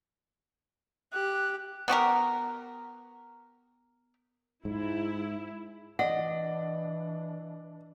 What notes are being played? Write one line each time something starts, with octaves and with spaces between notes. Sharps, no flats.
G4 F#6
B3 F#4 G4 A#4
G#2 E4
E3 D4 D5 D#5 F#5